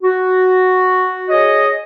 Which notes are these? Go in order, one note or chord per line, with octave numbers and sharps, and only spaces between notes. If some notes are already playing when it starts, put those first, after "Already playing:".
F#4
G#4 C#5 D#5